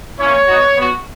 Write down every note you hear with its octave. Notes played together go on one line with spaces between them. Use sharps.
A#3 C#4 E4 C#5
B3 D#4 F#4
B3 F#4